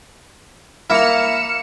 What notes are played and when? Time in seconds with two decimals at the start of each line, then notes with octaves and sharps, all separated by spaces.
0.90 A#3 E4 F6 C#7 E7